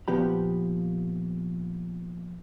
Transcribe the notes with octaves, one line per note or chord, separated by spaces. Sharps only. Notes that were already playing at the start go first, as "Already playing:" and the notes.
A#2 F3 B3 G4 B5